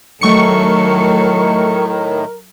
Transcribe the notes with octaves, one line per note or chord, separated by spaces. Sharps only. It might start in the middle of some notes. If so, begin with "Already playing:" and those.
A2 D#3 F#3 A3 A4 A#4 C#6 C#7